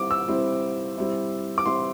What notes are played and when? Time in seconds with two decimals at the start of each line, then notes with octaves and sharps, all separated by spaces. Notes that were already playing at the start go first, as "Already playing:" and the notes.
Already playing: G3 C4 E4 D6
0.11 E6
0.28 G3 C4 E4
0.98 G3 C4 E4
1.58 D6
1.66 G3 C4 E4 C6